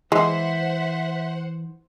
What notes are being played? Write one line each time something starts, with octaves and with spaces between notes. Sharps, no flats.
E3 G#3 C5 E5 F#5